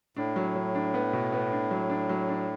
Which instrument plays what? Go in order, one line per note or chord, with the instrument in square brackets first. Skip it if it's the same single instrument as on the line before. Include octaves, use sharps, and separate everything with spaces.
[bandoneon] A2 [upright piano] D4
[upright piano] F#3
F#3
D4
B3
B2
B3
D4
F#3
D4
F#3
D4